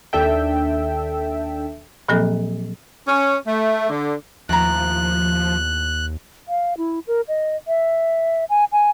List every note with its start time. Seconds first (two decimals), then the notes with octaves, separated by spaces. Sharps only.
0.13 D#2 D4 A4 E5 G5
2.09 A#2 F3 F#3 A#3 C4 A4
3.08 C#4
3.47 A3
3.89 D3
4.49 D#2 A2 F3 A#5 F#6
6.48 F5
6.78 E4
7.07 A#4
7.28 D#5
7.68 E5
8.50 G#5
8.72 G#5